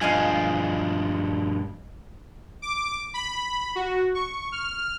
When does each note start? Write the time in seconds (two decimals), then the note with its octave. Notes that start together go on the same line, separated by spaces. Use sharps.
0.01 G2 F3 G#4 D#5 F5
2.62 D6
3.14 B5
3.75 F#4
4.15 C#6
4.52 F6